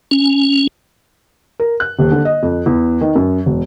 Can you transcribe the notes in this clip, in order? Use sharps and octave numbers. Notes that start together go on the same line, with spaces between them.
C#4
A#4
F#6
D#1
D3
D#5
F2
E2
D#3
F#2
E1